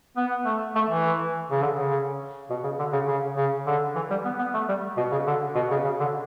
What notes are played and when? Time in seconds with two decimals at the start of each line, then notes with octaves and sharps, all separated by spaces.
0.17 B3
0.45 A3
0.75 A3
0.89 E3
1.51 C#3
1.62 D3
1.76 C#3
2.50 B2
2.63 C#3
2.79 D3
2.93 C#3
3.07 C#3
3.37 C#3
3.67 D3
3.95 E3
4.10 G3
4.25 B3
4.39 B3
4.54 A3
4.69 G3
4.97 B2
5.12 C#3
5.27 D3
5.55 B2
5.70 C#3
5.84 C#3
6.00 D3